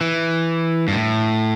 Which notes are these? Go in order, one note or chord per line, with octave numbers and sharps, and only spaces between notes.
E3
G2
A2